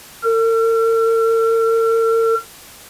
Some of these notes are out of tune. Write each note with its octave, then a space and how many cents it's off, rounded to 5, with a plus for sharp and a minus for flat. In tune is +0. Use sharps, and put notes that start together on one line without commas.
A#4 -45